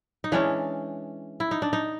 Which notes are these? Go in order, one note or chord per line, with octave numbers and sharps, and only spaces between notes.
D#4
E3 G#3 C#4 D4
E4
D#4
D4
D#4